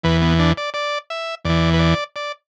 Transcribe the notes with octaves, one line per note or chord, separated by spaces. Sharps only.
E2 E3 B4
B3
D4
D5
D5
E5
E2 E3 D5
B4
D5
D5